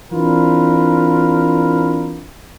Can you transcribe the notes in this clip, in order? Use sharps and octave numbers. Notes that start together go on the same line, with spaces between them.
E3 C4 D4 F4 A#4 B4